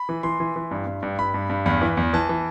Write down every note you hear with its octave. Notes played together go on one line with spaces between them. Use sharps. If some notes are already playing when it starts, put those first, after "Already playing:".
Already playing: B5
E3
E3 C6
E3
E3
G2
G2
G2
G2 B5
G2
G2
E2 B5
E3
E2
E3 A5
E3